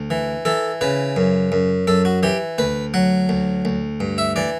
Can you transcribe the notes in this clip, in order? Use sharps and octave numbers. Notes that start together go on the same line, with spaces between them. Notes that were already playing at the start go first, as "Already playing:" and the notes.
Already playing: D2
E3
E3 A4
C#3 B4
F#2
F#2
F#2 A4
F#4
E3 G4
D2 B4
F#3 F#5
D2
D2
G2
E5
E3 D5